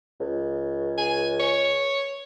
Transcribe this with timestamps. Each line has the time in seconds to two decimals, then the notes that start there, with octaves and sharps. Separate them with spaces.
0.20 C#2
0.98 G#5
1.40 C#5